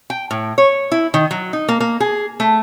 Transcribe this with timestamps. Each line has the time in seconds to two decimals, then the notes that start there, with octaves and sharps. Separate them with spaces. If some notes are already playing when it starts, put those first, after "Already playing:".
0.10 G5
0.31 A2
0.58 C#5
0.92 E4
1.14 D#3
1.31 F#3
1.53 D#4
1.69 A#3
1.80 A#3
2.00 G#4
2.40 A3